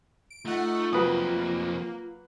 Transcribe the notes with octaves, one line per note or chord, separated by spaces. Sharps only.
D7
A3 D#4 F4 F#5
F2 F#3 A#3 G4 B4 D#6